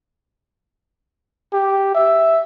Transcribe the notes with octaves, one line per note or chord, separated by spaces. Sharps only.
G4
E5